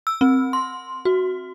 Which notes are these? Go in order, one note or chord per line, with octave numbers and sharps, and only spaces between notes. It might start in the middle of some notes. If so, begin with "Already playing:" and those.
E6
C4
C6
F#4